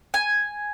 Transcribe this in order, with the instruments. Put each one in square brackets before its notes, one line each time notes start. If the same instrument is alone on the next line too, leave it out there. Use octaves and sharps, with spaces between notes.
[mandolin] G#5